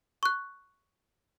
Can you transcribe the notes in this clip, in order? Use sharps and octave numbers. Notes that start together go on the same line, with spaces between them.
C#6 F#6